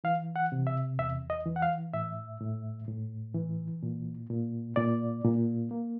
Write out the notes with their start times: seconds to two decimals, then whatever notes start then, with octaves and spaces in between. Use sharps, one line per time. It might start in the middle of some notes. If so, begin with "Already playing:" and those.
0.04 E3 F5
0.36 F#5
0.52 C3
0.67 E5
0.99 E2 E5
1.30 D#5
1.46 E3
1.56 F#5
1.62 F5
1.93 A2 E5
2.40 A2
2.88 A2
3.34 E3
3.83 A#2
4.30 A#2
4.76 A#2 D5
5.24 A#2
5.71 A#3